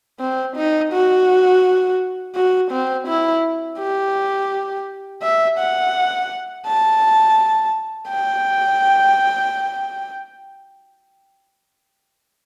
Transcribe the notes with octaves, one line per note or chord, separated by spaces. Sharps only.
C4
D#4
F#4
F#4
C4
E4
G4
E5
F#5
A5
G5